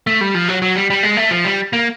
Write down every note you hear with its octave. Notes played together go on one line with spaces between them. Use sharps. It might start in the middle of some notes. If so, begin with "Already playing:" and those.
A3
G3
F3
F#3
F#3
G3
G3
G#3
A3
F3
G3
A#3